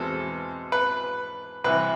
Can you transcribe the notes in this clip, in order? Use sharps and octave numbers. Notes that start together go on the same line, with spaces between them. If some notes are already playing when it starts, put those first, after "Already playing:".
Already playing: E2 B2 G#3 C4 A4
B4
C2 C3 E3 B4